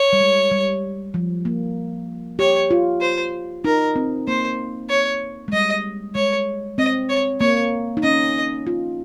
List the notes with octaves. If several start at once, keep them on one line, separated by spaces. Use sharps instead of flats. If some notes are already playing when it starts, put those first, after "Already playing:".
Already playing: C#5
G3
G#3
G3
F3
A#3
G4 C#5
F4
C5
D#4 A#4
C4
A#3 C5
C#5
G#3
G3 D#5
G#3 C#5
C4 D#5
C#5
A#3 C#5
D#4
C#4 D#5
F4